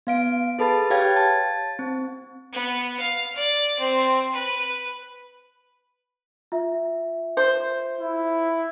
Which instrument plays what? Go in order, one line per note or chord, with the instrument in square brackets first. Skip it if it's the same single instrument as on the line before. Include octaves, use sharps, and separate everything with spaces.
[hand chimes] B3 F5 D7
G#4 A4 B4 A5 B5 A6
G4 C#5 F5 G5 G#6 A6
A5 A6
C4
[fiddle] B3
F5
D5
C4
B4
[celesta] F4 E5
[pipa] C5
[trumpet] E4